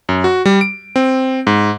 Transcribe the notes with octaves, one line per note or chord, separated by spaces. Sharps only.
F#2
F#4
G3
D7
C4
G#2